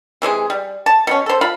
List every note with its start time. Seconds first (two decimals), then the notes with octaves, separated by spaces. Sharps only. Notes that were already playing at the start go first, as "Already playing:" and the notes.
0.22 C3 E3 G#3 G#4
0.50 G3
0.86 A5
1.07 B2 C#4
1.26 A4 C5
1.41 F4 F5 B5